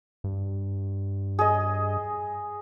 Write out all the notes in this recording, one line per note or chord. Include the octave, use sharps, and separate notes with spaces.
G2
G#4 D#5